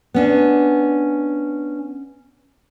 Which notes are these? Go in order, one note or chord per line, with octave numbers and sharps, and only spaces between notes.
B3 C#4 D4